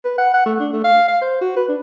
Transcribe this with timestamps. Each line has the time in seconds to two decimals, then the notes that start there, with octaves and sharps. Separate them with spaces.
0.05 B4
0.18 F#5
0.34 F#5
0.46 A3
0.60 D4
0.73 A3
0.84 F5
1.08 F5
1.21 C5
1.41 F#4
1.56 B4
1.68 D4